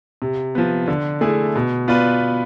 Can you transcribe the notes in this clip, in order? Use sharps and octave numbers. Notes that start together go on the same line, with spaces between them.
C3
F3 B3
D3
A3 E4 G#4
B2
B3 F4 B4 D5